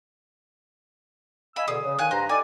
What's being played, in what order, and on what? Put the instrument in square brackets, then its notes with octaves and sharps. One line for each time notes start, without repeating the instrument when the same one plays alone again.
[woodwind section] D#5 G#5 E6 [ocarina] F5 [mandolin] B5
[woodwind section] B2 D3 [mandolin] G#4 [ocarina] D5
[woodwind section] C#3 E3 [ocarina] C#5
[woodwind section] D#3 [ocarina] F5 [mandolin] G#5 F#6
[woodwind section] G2 B4 A#5 [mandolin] C5
[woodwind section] D#4 A4 D5 [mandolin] G#5 [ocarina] D6